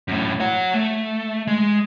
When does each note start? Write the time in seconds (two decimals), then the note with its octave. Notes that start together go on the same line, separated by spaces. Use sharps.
0.08 F#2 A2
0.40 C#5 F#5
0.74 A3
1.47 G#3